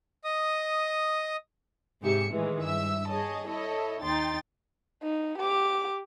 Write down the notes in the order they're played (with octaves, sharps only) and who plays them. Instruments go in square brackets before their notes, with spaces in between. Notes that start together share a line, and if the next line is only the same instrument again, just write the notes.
[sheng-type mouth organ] D#5 D#6
[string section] G#2 C3 G4 G#4 E5 C#7
A2 D#3 E3 G#3
G2 E5 E6
G#4 C#5 D#5 A5
E4 A4 C#5 D#5
D#2 D#4 G5 C6 A6
[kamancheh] D#4
G4 D6